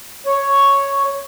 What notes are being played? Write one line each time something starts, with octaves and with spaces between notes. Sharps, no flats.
C#5